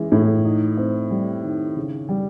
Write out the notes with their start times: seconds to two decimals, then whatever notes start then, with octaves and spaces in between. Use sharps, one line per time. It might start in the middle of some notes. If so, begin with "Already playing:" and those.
Already playing: E3 G#3 C#4
0.12 A2
0.45 D#4
0.77 C4
1.11 G3
1.43 D#3
1.76 C#3
2.09 G3